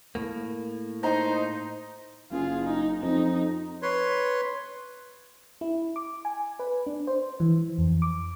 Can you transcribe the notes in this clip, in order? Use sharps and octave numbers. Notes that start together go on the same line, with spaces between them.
A2 A#3
D#4 C5 A#5
F#1 F4 G#4
D#4
F2 D#4
B4 C#5 C6
E4
D6
G#5
B4
D4
C5
E3
F2
D6